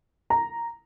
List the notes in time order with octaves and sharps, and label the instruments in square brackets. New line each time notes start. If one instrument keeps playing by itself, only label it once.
[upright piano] A#5